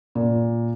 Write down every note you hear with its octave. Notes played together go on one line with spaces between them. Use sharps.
A#2